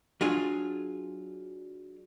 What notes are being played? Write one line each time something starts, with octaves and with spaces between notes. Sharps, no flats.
F#3 D4 F4 G#4